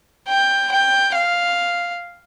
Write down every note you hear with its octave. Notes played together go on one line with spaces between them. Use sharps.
G5
G5
F5